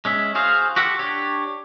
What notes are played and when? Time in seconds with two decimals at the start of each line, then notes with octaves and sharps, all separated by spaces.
0.05 G#3 C#4 E5
0.35 F#4 G#4 C5 F5
0.76 F#4 G4 A4 F#5
0.99 D4 G4 C#5